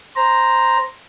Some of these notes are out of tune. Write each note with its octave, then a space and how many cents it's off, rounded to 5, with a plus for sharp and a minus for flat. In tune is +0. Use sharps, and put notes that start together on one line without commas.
C5 +0 A#5 +0